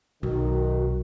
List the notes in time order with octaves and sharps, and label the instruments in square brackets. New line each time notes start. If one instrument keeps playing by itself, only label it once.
[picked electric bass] B1 [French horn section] D#3 [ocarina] F#4